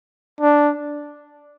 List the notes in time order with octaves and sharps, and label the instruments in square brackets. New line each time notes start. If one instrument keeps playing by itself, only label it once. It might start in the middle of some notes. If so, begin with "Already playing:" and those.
[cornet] D4